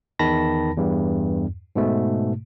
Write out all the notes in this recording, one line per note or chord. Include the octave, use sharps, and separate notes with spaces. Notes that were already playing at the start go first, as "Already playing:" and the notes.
E2 D#3 A5 B5 A#6
E2 G2
G#2 B2 A3